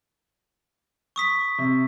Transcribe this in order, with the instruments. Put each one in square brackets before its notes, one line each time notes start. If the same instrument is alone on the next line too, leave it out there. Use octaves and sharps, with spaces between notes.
[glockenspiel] C#6 D#6 B6
[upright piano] C3